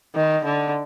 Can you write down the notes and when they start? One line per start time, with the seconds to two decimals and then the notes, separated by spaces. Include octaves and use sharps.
0.15 D#3
0.44 D3